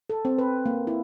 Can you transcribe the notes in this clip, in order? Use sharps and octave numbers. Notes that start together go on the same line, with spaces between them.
A4
C4
B4
A#3
E4